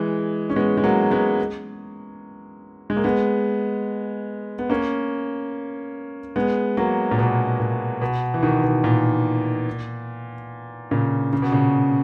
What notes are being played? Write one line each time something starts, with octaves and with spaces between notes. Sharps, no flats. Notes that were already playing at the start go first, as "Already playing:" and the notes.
Already playing: E3 G#3
C#4
G#3 B3
G#3
F#3 A#3
G#3 B3
G#3
A#3
G#3 B3
B3
A#3 C#4
G#3 B3
F#3 A#3
A#2
B2
A#2
B2
E3
B2 D#3
B2
A#2
A#2 C#3
C#3
B2
A#2 C#3